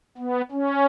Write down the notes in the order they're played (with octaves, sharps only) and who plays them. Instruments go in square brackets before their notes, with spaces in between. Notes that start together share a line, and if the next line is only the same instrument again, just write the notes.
[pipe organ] B3
C#4